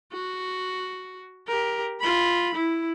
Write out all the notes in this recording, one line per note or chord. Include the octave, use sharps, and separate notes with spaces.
F#4
G4 A#4
F4 B5
E4